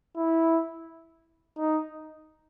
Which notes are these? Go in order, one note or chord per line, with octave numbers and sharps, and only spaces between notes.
E4
D#4